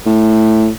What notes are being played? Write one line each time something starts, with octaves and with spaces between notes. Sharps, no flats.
A2